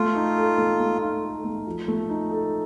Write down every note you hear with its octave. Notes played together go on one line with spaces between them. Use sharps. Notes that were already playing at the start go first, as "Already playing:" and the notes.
Already playing: A3 F4
D#4
A4
A3
A3
D#4
A4
A3
F3
A3
D#4
A4